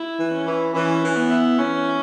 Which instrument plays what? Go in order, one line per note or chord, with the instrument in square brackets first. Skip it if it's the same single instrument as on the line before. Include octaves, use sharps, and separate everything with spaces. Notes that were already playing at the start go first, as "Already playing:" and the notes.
Already playing: [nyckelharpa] E4
[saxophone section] E3
[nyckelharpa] C#4
[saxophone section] E3
[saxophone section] E3 [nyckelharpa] C#4
[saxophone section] E3
[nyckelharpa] B3
[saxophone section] E4
[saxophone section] E3 [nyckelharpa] C#4
[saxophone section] E4